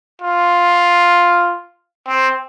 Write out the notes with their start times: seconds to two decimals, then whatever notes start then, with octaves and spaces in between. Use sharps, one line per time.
0.21 F4
2.07 C4